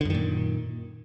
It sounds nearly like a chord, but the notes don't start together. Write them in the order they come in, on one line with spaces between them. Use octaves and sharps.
D3 F#2 D#3 A#2